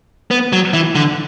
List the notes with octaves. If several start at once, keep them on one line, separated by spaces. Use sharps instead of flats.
B3
F#3
E3
D3